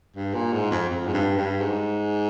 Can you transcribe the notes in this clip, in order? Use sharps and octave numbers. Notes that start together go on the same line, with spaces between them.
G2
A#2
G#2
F2
F2
G#2
G2
G2
G#2